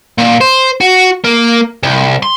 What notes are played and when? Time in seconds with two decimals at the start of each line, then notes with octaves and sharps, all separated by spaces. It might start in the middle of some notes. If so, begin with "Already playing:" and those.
0.18 A#2
0.41 C5
0.81 F#4
1.25 A#3
1.83 C2
2.23 C6